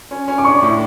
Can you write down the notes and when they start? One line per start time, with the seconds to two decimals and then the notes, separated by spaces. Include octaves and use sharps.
0.11 C#4
0.28 C#4
0.38 D6
0.45 D4 C#6
0.62 A2